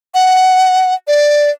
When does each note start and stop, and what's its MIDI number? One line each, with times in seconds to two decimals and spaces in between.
0.14 0.94 78
1.08 1.50 74